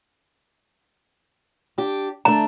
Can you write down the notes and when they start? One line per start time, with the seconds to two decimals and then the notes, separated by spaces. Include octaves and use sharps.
1.78 D4 G4
2.25 A3 D4 A#5